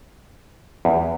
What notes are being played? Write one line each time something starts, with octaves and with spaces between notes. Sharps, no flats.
E2